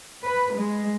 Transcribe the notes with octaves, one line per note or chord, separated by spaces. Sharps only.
B4
G#3